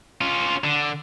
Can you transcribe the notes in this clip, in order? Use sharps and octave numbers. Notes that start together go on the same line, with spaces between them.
C#4 F4
D3